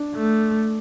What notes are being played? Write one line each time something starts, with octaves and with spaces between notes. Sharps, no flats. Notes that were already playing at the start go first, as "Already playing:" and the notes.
Already playing: D4
A3